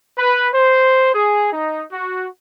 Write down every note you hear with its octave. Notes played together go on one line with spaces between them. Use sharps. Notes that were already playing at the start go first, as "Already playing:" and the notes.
B4
C5
G#4
D#4
F#4